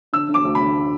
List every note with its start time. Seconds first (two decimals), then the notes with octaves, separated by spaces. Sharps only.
0.13 D3 E6
0.29 D3
0.34 D6
0.45 D2
0.55 B5
0.61 D3